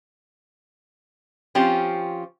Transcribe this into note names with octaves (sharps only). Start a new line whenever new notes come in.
F3 C4 C#4 F4 G4